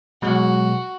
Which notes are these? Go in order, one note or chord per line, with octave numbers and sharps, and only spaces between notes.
B2 F#3 G#3 F#4